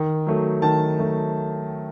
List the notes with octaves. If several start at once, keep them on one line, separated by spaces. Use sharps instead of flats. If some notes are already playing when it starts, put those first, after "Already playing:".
Already playing: D#3
F#3 A3
D#3 A5
F#3 A3